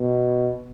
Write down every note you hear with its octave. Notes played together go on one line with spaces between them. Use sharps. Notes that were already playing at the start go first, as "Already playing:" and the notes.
Already playing: B2